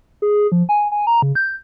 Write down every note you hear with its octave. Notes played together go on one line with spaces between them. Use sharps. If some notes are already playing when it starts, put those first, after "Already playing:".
G#4
F3
G#5
G#5
A#5
C#3
G6